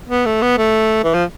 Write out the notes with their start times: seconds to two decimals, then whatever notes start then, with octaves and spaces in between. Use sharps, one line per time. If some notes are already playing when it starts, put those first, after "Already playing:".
0.09 B3
0.26 A3
0.42 B3
0.57 A3
1.04 E3
1.14 F3